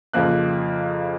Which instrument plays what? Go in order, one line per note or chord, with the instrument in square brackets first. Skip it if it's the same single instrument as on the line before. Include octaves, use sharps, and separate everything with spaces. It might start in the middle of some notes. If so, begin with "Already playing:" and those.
[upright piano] F2 C#3 F3 A#3 F#6